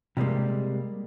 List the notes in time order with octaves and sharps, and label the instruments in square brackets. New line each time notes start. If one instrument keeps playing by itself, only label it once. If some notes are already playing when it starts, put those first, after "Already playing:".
[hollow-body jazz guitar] C3 G3 G#3 A#3